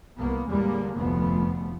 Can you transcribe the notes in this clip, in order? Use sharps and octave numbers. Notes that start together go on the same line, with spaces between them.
C2 A#3 B3
E2 A2 D3 G3 G#3 A#3
F1 D2 F3 A3 B3